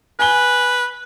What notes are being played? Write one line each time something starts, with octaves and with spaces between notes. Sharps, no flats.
B4 G#5 G7